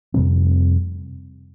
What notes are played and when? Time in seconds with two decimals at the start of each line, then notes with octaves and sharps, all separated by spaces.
0.14 F2 C3 G3 C4